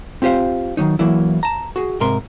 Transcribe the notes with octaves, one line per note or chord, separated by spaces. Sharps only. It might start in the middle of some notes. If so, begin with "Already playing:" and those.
C4 F4 G4 C5 F5
D#3 E3 F#3 D#4
E3 F#3 A#3 E4
A5 A#5
F#4 G#4
G#2 C3 A#4 C6